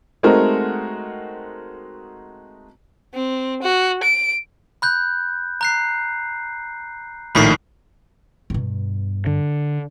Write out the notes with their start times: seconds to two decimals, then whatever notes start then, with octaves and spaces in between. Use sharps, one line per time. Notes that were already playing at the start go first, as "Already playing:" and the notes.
0.23 G#3 A3 C4 D#4 F#4 A#4
3.14 C4
3.62 F#4
4.03 D7
4.82 B5 F#6 G6
5.61 A#5 F#6 C7
7.35 A#1 A2 D#3 B5 B6 C7
8.50 G2 B2
9.26 D3